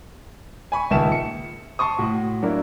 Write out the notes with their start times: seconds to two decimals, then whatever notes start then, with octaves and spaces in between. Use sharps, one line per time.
0.72 G#5 B5 C#6
0.91 C#2 A#2 D#3 E5 A5 E7
1.12 C#7
1.79 A5 C6 C#6 D#6
1.99 A2 F#4
2.42 F#3 A#3 D4 E4